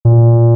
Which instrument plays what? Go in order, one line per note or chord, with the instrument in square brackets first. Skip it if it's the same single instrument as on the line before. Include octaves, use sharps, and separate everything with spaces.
[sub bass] A#2